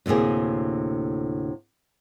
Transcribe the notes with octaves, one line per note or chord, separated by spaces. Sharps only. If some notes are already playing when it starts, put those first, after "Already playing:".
D2 A2 C3 A#3 G#4